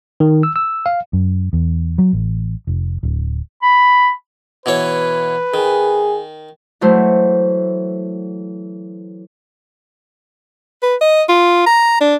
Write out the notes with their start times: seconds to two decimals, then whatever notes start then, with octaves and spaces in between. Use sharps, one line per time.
0.20 D#3
0.43 E6
0.56 E6
0.86 F5
1.13 F#2
1.53 E2
1.98 F#3
2.13 A1
2.67 F1
3.03 D1
3.62 B5
4.66 B2 E3 B4 C#5
5.54 D#3 G#4
6.81 E3 F#3 A3 C5
10.82 B4
11.01 D#5
11.29 F4
11.66 A#5
12.01 D4